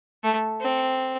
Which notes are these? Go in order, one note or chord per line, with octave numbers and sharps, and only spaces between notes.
A3
C4